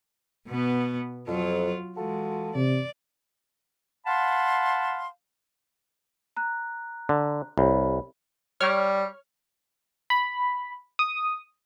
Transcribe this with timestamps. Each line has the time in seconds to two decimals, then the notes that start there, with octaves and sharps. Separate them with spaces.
0.48 B2 B3
1.28 F2 F#3 F4
1.97 E3 G#3 F4 F#4 A4
2.55 C3 D5
4.07 F5 F#5 A5 B5 C6
6.37 A#5 F#6
7.09 D3
7.58 C2 G4 C#5 B5
8.61 G3 C#5 C#6 F6
10.10 B5
10.99 D#6